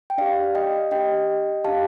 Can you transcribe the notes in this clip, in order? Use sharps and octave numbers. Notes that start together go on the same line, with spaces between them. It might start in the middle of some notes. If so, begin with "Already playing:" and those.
G5
D4 G4 D5 F5
D#5 G5
D4 G4 D#5 G5
D4 G4 F5 A5